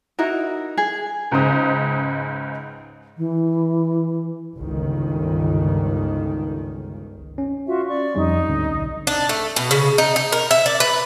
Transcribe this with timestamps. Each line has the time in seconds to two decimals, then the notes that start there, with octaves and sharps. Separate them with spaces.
0.19 D#4 E4 F#4 A#4
0.77 G#4
1.31 C#2 G#2 C#3 C5 D#6
3.18 E3
4.57 G1 C#2 D#3
7.38 C#4
7.67 F4 F#4 E5
7.88 D5 C#6
8.15 F2 G3 C#4 D#4
8.48 D2 G#2 D3
8.69 B1
9.07 D4
9.29 A3
9.56 B2
9.71 C#3
9.98 D#4
10.16 D#4
10.32 A#4
10.51 E5
10.66 D5
10.80 B4